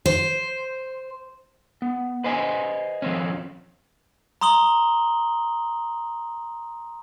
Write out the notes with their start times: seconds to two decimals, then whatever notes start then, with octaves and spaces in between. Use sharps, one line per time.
0.06 C5
1.82 B3
2.24 B4 C5 D#5 G#5
3.02 F3 C4 C#4
4.41 A#5 C6 D#6 F#7 G7